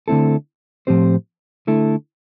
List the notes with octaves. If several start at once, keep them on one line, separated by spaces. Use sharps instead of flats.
D3 A3 C4 E4 A4
A2 F3 C4 G4 C5
D3 A3 E4 A4